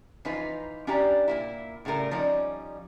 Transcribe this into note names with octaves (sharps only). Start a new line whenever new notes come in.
E3 F3 D#4 F4 B4
C#4 D4 E4 G4 D5 A#5
A#2 A#3 E4
A2 C#3 G3 A3 A#4
F3 G3 C#4 D#4 D5